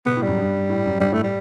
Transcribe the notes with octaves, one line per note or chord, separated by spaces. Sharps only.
B2 B3
A2
G3
F#2
G2
A2
F#2
G2 G3
A2 A3
G3